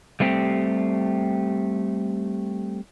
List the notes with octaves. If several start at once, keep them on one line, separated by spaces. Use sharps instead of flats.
G3 A3 C4 G4